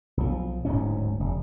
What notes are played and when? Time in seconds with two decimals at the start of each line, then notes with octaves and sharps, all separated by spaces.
0.17 B1 F3
0.65 D1 D2 G#2 C#4
1.20 F1